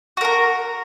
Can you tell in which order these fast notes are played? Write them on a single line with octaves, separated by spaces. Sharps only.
F#4 A#4 A#5